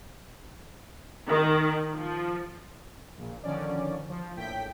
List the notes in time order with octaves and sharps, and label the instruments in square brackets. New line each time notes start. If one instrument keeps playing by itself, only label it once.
[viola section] D#3
F3
[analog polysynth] A#1 A#2
D3 D#3 F3 C#4 D5
F3
A#1 A2 G5 B6